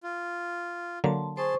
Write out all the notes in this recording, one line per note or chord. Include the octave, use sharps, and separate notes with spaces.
F4
D3 F#3 A#3 A5 C6
G#4 C5 A5 C6 C#6